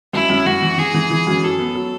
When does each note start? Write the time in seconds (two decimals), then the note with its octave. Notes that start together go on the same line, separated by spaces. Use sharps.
0.13 F#2 E4
0.30 F#2
0.46 F#2 F#4
0.62 E3
0.78 E3 G#4
0.94 E3
1.11 E3
1.27 F#2
1.43 F#3 A4
1.60 B3
1.75 F#3